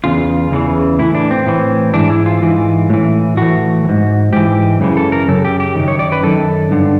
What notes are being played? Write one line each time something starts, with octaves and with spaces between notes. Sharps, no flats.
E2 C#3 F4
E2 C#3 E3
A2 E3 E4
D4
C4
A2 E3
G#2 E3 D4
E4
F4
G#2 E3
A2 E3
A2 E3 F#4
E3
G#2
G#2 E3 G4
F#2 C#3 E3
A4
A#4
F#2 C#3 A4
G4
G4
F#2 D#3
C#5
D5
B4
F#2 D#3 A4
G2 D3